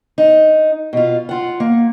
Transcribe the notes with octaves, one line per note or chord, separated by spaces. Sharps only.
D#4
B2 F4
F4 F#5
A#3